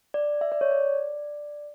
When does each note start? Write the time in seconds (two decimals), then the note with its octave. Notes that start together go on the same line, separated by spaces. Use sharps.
0.14 D5
0.41 E5
0.52 D5
0.61 C#5
0.71 D5